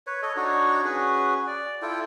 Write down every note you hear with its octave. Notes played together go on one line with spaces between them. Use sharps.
B4 C#5
A4 C#5 D#5
D4 D#4 F#4 C#5
C#4 F#4 G#4 B4
D5
E4 F4 A4 G5